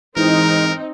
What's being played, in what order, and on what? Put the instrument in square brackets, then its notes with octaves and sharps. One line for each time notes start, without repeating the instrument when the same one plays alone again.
[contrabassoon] G#2 [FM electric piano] E3 [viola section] C4 D#4 [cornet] A#4